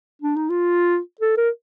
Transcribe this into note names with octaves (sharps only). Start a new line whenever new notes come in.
D4
D#4
F4
A4
A#4